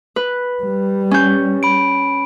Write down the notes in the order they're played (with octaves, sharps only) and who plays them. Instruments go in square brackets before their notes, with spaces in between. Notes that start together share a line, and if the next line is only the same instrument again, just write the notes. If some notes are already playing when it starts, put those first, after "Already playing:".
[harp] B4
[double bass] G3
[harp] C#4 G6
[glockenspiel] B5 D7